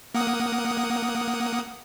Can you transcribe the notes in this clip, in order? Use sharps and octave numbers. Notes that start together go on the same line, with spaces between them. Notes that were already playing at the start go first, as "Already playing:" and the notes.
A#3 F#5 D#6